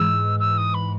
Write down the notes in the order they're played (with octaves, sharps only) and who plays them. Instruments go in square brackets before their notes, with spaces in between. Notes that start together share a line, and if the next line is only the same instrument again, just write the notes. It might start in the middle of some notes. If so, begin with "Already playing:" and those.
Already playing: [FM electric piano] G#2 E3 G#3 [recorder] E6
[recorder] E6
D#6
B5